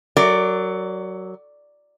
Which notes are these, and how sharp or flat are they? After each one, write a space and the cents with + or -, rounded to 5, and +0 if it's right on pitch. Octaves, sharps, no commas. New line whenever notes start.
F#3 +15 A#4 -25 D5 +0